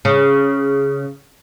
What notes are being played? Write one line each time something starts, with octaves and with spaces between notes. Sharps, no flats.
C#3